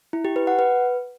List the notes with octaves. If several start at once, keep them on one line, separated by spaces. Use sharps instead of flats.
E4
G4
B4
F#5
B4